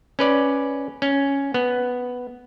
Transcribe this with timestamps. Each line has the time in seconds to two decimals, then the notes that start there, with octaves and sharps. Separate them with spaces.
0.19 C#4 B4 D5
1.02 C#4
1.54 B3